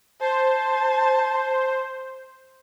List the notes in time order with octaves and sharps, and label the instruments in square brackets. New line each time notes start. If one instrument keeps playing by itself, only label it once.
[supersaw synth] C5 [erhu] A5